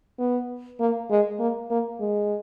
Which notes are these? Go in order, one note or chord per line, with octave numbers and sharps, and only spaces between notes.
B3
A#3
G#3
A#3
A#3
G#3